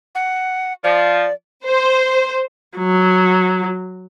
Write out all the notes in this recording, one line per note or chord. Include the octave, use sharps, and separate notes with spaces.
F#5
F3 D5
C5
F#3